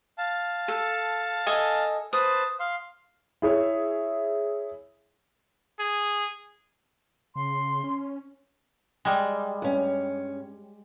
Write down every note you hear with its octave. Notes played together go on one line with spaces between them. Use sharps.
F5 A5
A4
A4 D#5 G#5
B4 C5 A5 D#6
F5 C6
E4 G#4 C#5 E5
G#4
C#3 C6
C#4
G3 G#3
G2 C#4